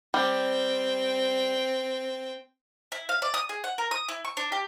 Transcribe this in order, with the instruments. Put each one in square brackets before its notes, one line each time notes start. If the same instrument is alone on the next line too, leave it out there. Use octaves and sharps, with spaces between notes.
[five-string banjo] G3 [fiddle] C4 G5
[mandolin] E4
F5
D5
D#6
G#4
F#5
A#4
D#6
E4
C#6
D4
G4